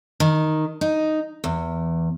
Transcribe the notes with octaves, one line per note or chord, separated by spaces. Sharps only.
D#3
D#4
E2